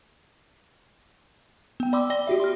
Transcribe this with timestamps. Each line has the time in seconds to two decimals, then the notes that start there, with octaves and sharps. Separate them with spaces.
1.80 B3 G5
1.93 D5 G5 B5 C6 D6 E6
2.10 D5 G5 A#6 G7
2.27 F#4 G4 E5
2.40 C6 F6